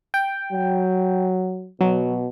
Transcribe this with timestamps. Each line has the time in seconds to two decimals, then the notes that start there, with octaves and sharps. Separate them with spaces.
0.14 G5
0.52 F#3
1.81 B2 F#3